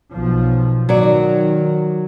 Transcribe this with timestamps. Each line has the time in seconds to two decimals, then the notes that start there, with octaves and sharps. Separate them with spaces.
0.12 B1 F3
0.89 D#3 F#3 D5